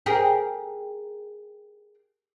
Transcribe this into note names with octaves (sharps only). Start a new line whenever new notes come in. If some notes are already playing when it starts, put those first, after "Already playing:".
G4 G#4 A#4